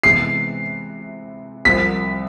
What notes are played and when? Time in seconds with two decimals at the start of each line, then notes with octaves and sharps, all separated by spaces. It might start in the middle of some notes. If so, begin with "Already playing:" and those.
0.03 C3 E3 G#3 B3 C7
1.65 C2 C3 F3 B6